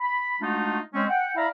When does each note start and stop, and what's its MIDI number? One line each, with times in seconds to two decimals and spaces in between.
0.01 0.36 83
0.41 0.79 56
0.41 0.79 57
0.41 0.79 62
0.41 0.79 63
0.41 0.79 65
0.41 0.79 66
0.94 1.05 56
0.94 1.05 60
0.94 1.05 61
1.09 1.36 78
1.09 1.36 79
1.36 1.48 64
1.36 1.48 74
1.36 1.48 76
1.36 1.48 77
1.36 1.48 82
1.36 1.48 83